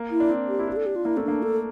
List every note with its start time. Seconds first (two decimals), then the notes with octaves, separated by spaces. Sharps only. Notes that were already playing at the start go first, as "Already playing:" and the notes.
Already playing: A#3
0.11 E4
0.20 D4
0.30 C4
0.48 G4
0.59 E4
0.67 D4 G4
0.77 A4
0.86 G4
0.96 F4
1.05 A#3 E4
1.17 A3 C4
1.24 A#3 D4
1.43 A4